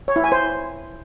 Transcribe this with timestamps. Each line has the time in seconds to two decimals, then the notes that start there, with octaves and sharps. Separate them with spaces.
0.08 C#5
0.16 E4
0.24 G#5
0.32 C5